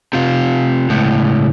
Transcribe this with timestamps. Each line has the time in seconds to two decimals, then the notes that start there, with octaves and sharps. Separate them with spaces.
0.13 C3 F4
0.90 C#2 A2